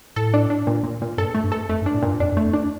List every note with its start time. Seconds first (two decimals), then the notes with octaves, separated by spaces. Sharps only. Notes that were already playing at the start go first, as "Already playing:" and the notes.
0.16 A2 A4
0.34 D4
0.50 D4
0.67 A#2
0.84 A#2
1.02 A#2
1.18 G2 A4
1.34 A3
1.44 G2
1.52 A4
1.69 F2 A3
1.82 G2
1.86 D4
1.94 A2
2.02 G2 A#2
2.20 F2 D4
2.32 F2
2.37 A3
2.45 F2
2.53 D4